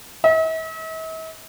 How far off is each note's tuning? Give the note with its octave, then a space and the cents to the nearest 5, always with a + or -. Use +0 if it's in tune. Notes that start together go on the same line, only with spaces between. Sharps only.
E5 -45